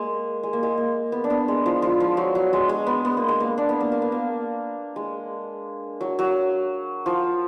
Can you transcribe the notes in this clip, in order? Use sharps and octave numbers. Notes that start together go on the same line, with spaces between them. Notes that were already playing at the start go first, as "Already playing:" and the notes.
Already playing: G#3 A#3
G#3
A#3
G#3
A#3
B3
D4
B3
G#3
F3
F3
F3
F#3
F#3
G#3
G#3
B3
B3
A#3
G#3
A#3
D4
B3
A#3
A#3
B3
A#3
G#3
F#3
F#3
F3